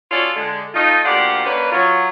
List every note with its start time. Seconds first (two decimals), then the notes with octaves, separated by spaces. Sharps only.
0.11 C#4 F4 F#4 A4 C#5 D5
0.36 D3 G#3
0.74 A3 D#4 F4
1.05 D2 A#3 F4 G4 D5 F#5
1.45 A#3 C#4 D4 B4
1.72 F#3 F4